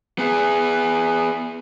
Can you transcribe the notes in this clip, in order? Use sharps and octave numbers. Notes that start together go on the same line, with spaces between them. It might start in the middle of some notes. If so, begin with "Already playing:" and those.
B3 G#4